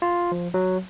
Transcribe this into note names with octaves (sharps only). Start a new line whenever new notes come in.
F4
F3
F#3